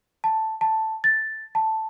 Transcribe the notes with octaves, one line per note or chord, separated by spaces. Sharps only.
A5
A5
A6
A5